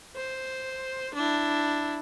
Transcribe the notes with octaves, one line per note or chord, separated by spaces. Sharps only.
C5
D4 E4